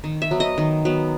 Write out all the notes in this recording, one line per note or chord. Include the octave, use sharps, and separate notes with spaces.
D#3
E5
F#3 B3
D#5
D#3
F#3 B3